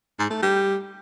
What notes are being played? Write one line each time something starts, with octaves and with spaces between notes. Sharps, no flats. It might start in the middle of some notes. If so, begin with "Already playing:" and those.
G#2
A3
G3